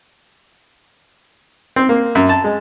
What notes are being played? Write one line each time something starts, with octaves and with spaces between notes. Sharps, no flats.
C4
A#3
F#2
A5
G#3